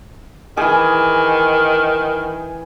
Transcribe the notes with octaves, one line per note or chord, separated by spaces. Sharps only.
D#3 E3 G#4